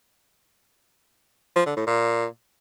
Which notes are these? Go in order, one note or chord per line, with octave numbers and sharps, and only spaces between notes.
F3
D3
A2
A#2